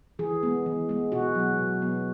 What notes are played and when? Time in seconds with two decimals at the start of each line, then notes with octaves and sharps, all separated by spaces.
0.19 E3 G#4
0.43 G#3 B3
0.66 E3
0.89 G#3 B3
1.12 B2 F#4
1.35 F#3 B3
1.59 B2
1.82 F#3 B3